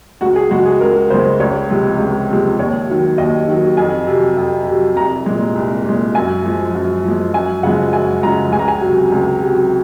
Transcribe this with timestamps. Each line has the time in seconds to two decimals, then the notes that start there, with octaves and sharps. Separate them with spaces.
0.21 C#2 F#4
0.36 G#4
0.51 C#3 G#3 F#4
0.66 G#4
0.81 C#2 A#4
1.10 C#3 G#3 C5
1.40 C#2 C#5
1.70 C3 F3 G#3
1.99 C#2
2.29 C3 F3 G#3
2.59 D#2 C#5
2.89 D#3 F#3
3.18 D#2 D#5
3.48 D#3 F#3
3.77 F2 G#5
4.07 C3 F#3
4.37 F2
4.67 C3 F#3
4.96 C2 A#5
5.26 A#2 G#3
5.56 C2
5.85 A#2 G#3
6.15 F#2 G#5
6.45 F3 G#3
6.75 F#2
7.04 F3 G#3
7.34 F#2 G#5
7.63 C#3 F3 G#3 F#5
7.93 F#2 G#5
8.23 C#3 F3 G#3 A#5
8.52 C#2 G#5
8.59 A#5
8.68 G#5
8.82 C3 F#3
9.12 C#2
9.41 C3 F#3